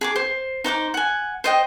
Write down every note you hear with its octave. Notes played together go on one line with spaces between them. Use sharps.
G#4 B5 D6
C5
D#4 C5 F#5 D6
F#5 G#5
C5 D#5 G5